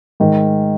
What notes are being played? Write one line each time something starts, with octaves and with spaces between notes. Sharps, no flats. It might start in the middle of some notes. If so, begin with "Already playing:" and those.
G#2 D#3